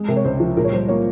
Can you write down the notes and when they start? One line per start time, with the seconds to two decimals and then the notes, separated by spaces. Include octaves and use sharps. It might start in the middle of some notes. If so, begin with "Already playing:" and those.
Already playing: G#3
0.08 C3 A#4
0.17 C#5
0.24 C#2 C5
0.40 F3
0.57 A#2 A#4
0.64 C#5
0.72 G3 C5
0.88 A#3 C#5